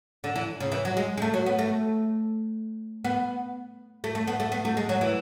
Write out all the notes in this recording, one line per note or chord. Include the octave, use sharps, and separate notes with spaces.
D3
E3
C#3
E3
F#3
G#3
G#3
A3
F#3
B3
A3
B3
A3
A3
B3
A3
B3
A3
G#3
F#3
E3